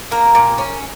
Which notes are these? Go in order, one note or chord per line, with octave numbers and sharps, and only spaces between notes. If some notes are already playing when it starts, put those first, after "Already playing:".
A#3 A#4
A#2
C#4